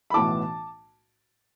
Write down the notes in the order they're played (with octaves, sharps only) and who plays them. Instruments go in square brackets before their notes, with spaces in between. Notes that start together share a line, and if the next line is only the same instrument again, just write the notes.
[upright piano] B5
[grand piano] B1 A2 E3 B3 E4 [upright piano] A5 D6